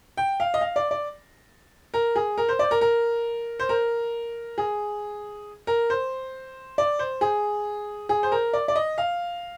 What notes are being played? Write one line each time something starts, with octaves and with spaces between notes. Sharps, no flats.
G5
F5
D#5
F5
D5
D5
A#4
G#4
A#4
C5
D5
A#4
A#4
C5
A#4
G#4
A#4
C5
D5
C5
G#4
G#4
C5
A#4
D5
D5
D#5
F5